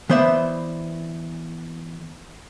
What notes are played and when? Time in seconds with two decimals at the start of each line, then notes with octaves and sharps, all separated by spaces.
0.09 E3 B3 C5 D5 E5